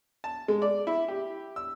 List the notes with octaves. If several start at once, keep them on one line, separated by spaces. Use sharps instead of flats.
A5
G#3
D5
E4
G4
E6